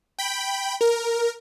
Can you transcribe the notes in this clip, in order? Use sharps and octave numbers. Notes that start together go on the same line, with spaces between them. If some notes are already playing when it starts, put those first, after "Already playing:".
G5 B5
A#4